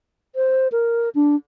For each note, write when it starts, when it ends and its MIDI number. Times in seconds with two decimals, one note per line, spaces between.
0.35 0.68 72
0.72 1.09 70
1.15 1.36 62